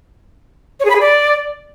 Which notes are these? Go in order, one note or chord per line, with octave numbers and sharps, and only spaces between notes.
C#5
G#4
B5
G#4
D5